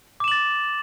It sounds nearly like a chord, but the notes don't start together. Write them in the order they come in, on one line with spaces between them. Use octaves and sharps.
D6 E7 F#7 A6